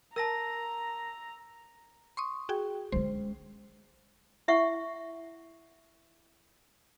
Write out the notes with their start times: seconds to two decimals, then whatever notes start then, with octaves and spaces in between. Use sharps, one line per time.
0.16 A#4 A5 A#5 E6 A#6
2.17 C6 C#6 D#6
2.49 F#4 G#4 G5
2.92 G#3 C#4 C5
4.48 E4 E5 F#5 C#6